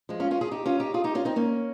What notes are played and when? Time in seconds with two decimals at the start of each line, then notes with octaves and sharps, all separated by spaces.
0.09 F3 G#3
0.20 C#4 F4
0.31 C#4 F4
0.41 F4 G#4
0.51 D#4 G4
0.66 C#4 F4
0.80 D#4 G4
0.94 F4 G#4
1.04 D#4 G4
1.15 C#4 F4
1.25 C4 D#4
1.36 A#3 C#4